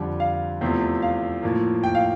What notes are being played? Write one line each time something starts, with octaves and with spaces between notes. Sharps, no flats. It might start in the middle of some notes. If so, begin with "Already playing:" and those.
Already playing: F2 D3 G3
F5
E2 C3 F3 A3 C4
F5
A2 F3 A#3
G5
F5